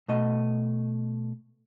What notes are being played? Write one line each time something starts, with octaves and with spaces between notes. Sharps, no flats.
B2 A3 D#5